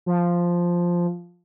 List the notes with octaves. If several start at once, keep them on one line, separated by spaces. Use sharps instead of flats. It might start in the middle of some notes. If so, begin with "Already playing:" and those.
F3